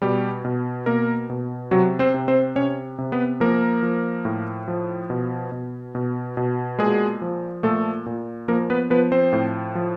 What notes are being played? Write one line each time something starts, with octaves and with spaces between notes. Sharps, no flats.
B2 G3 G4
B2
B2 A#3 A#4
B2
C3 F#3 F#4
C4 C5
C3
C4 C5
C3 C#4 C#5
C3
B3 B4
F3 A#3 A#4
F3
A2
F3
B2
B2
B2
B2
A#2 G#3 G#4
F3
A#2 A3 A4
A#2
F3 A#3 A#4
B3 B4
F3 B3 B4
C4 C5
A2
F3